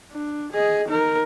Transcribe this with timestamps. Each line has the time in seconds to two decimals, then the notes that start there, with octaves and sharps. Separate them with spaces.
0.12 D4
0.52 G#4 D#5
0.88 D#4 A#4